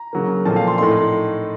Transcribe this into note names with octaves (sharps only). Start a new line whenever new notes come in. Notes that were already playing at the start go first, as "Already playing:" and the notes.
Already playing: A#5
C#3 F#3 A#3
A#2 F3 A3 C4 A5
F5
C6
A2 A3 D#4 C6